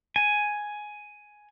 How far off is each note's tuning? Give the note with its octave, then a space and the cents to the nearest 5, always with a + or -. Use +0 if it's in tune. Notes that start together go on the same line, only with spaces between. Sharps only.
G#5 +5